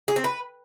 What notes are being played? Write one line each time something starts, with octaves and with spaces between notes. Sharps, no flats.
G#4
C4
B4